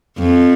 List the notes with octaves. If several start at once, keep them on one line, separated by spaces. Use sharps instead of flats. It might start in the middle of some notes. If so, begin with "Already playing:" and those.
F2